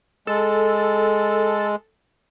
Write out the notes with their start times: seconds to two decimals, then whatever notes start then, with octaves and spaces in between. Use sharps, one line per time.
0.27 G#3 A4